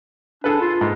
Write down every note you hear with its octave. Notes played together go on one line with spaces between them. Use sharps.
D4 G#4 A4 B4
F4
G#2